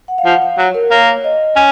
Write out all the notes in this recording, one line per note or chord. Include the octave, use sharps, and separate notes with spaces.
F#5
F5
F3 F#5
F5
F#3 C#5
A#4
A#3 C#5
D#5
C#4 C#5